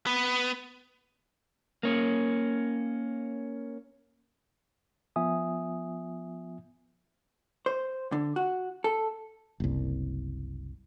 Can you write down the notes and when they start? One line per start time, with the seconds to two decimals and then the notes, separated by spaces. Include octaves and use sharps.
0.06 B3
1.83 A#3 C#4
5.16 F3 B3 F4 E5 G#5 D#6
7.66 C5
8.12 D3
8.36 F#4
8.84 A4
9.60 F#1 C2